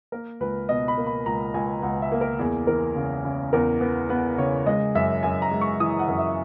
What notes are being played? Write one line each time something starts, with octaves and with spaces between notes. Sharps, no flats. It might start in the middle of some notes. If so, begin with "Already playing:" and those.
A#3 A#4
C#2 B4
B2 D#5
B5
A#3
B5
C#2 A#5
C#2 G#5
C#2 F#5
E5
A#3
A#4
E2 G#4
E3 A#4
C#3
C#3
E2 A#4
B3
B3 B4
C#3 C#5
G#3 D#5
F#2 E5
F#2 G#5
A#5
G#3
C#6
E3 D#6
F#5
F#2
E5